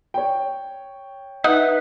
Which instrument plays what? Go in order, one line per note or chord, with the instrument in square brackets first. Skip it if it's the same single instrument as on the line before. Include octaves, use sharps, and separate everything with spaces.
[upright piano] C#5 G5
[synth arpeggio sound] D#4 [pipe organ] B4 E5 [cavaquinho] F#5